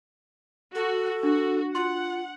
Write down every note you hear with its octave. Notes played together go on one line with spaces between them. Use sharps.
F#4 A4
D4 F#4
F4 F#5 C6